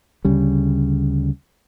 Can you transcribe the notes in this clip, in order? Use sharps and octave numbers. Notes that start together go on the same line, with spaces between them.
D2 C#3 G3